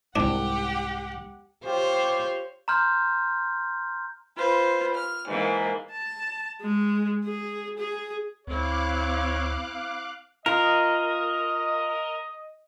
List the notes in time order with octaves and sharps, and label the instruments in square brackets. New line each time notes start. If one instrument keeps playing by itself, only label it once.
[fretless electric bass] C2 G#2 [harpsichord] D4 [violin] G4 F#5
[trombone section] F4 G4 [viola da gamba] C5 C#5
[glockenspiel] A#5 C6 F6 G6
[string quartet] F4 B4 C5
F6
G#2 E3 A#3
[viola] A5
G#3
G#4
G#4
[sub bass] D2 [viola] C4 E4 [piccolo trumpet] C#5 [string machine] F5 D6 F#6
[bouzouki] F4 [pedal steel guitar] A#4 [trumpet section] D#5